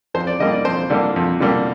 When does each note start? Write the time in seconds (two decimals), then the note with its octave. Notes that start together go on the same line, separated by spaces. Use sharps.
0.14 F2 C5
0.27 D5
0.40 D3 G3 A#3 D#5
0.52 D5
0.65 F2 C5
0.90 D3 G3 A#3
1.16 F2
1.40 D3 G3 A#3